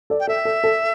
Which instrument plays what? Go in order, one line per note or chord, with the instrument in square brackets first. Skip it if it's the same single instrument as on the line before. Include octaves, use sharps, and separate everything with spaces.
[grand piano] A4 D5
[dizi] G5
[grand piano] A4 [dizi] E5
[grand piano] A4
A4